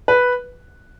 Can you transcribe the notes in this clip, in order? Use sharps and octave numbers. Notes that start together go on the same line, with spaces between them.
B4